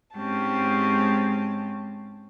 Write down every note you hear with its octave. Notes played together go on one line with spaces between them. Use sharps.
G#2 G#3 C4 C#4 G4 A5